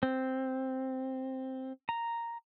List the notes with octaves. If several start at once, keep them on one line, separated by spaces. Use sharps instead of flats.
C4
A#5